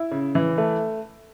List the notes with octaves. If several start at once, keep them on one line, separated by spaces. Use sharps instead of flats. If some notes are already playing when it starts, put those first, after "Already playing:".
Already playing: E4
C#3
E3
A3